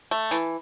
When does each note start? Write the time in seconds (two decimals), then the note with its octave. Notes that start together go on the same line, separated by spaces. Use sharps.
0.11 A3
0.31 E3